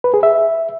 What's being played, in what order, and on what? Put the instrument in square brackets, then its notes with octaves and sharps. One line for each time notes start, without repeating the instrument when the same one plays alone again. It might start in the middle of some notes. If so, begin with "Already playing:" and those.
[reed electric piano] B4
G#4
E5